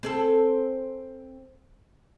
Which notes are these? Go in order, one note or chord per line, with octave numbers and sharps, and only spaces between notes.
C4 G#4 A4